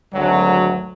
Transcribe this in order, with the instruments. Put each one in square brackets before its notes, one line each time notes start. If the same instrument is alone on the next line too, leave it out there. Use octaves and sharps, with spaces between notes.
[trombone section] G#1 D2 F#3